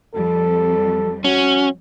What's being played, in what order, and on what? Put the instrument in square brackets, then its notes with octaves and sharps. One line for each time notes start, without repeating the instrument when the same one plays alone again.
[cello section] F2 G3 [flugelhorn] A4
[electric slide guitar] C#4 [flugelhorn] F#4